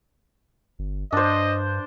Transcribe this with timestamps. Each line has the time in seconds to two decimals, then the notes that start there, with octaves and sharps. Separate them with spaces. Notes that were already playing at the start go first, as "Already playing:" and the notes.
0.79 G1
1.12 G2 D4 C5 D#5